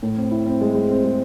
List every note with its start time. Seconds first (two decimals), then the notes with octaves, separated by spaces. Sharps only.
0.03 A2
0.17 C4
0.31 E4
0.46 C4
0.61 G#3
0.75 G#3
0.90 C4
1.04 G#3